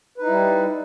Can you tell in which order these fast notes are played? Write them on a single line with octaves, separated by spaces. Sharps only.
B4 D#4 E4 G3